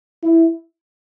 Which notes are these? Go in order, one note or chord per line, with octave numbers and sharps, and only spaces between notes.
E4